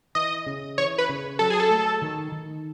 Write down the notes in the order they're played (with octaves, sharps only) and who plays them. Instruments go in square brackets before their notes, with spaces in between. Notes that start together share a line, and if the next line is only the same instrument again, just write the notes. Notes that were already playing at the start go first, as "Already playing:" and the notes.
[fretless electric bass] E3 [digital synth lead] D#5
[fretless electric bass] C#3
[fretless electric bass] E3 [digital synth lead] C#5
[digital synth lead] B4
[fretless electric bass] C#3
[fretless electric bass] F#3 [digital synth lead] A4
[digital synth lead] G#4
A4
[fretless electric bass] A3
D#3
D#3